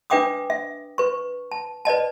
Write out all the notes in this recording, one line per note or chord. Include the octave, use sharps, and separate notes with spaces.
D4 B4 E5 G5 D6 D#6
E5
B4 C#6
A5
B4 D5 D#5 A5